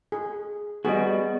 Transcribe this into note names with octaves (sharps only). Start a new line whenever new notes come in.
G#4
G3 B3 F#4 G#4 D#5